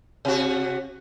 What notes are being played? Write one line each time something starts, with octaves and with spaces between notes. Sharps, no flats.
C3 F#4